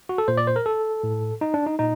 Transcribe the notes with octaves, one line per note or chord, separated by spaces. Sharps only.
F#4
A4
A#2 C5
D5
C5
A#4
A4
A2
D#4
D4
D#4
A#2 D#4